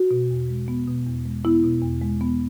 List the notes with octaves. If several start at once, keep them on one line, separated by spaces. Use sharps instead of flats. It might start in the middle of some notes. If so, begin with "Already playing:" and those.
Already playing: F#4
B2
E2
G#3
B3
B2
E2
G#3
B3 E4
B2
E2
G#3
B3